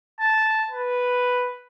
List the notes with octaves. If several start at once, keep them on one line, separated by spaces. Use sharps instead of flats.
A5
B4